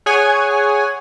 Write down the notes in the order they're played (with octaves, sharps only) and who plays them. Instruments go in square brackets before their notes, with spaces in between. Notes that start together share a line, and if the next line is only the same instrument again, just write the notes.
[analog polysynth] G#4 C#5 F#5 G#5